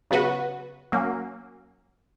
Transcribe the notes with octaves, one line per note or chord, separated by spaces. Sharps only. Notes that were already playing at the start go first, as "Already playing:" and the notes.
C#3 F#3 B3 F#4 B4
F#3 A#3 C#4